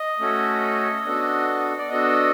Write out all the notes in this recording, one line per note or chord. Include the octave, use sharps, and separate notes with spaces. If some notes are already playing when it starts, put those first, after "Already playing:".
Already playing: D#5
A3 C#4 F#4 A4
B3 D4 F#4 A4
D5
B3 D4 F#4 A4 D#5